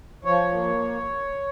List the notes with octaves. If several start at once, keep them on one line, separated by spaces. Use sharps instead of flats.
F3 C#5
A#3